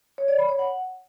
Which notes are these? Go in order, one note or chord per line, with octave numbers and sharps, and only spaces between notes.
C#5
D5
B5
C#5
F#5